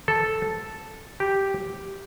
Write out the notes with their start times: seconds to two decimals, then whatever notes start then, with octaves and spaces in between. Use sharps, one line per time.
0.08 A4
1.20 G4